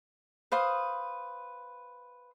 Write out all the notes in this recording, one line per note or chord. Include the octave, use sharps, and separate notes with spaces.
B4 C5 F5 D#6